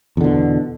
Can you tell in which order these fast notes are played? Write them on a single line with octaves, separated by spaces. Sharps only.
E2 D3 B2